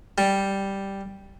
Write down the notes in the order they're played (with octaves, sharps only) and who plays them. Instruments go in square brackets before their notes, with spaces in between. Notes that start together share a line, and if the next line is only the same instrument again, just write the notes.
[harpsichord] G3